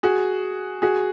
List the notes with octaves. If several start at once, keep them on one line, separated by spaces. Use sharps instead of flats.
F#4 G#4
F#4 G#4